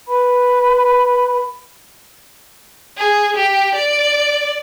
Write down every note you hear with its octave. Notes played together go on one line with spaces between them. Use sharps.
B4 B5
G#4
G4
D5